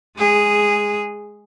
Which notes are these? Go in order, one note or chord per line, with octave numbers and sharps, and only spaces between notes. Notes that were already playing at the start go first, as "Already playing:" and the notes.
G#3 G#4